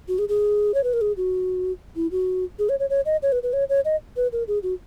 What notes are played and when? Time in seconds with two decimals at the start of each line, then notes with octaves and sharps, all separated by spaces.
0.08 F#4
0.19 G#4
0.29 G#4
0.74 C#5
0.84 B4
0.93 A#4
1.01 G#4
1.17 F#4
1.96 E4
2.11 F#4
2.59 G#4
2.69 C#5
2.80 C#5
2.90 C#5
3.06 D#5
3.22 C#5
3.32 B4
3.43 B4
3.53 C#5
3.69 C#5
3.85 D#5
4.17 B4
4.32 A#4
4.48 G#4
4.63 F#4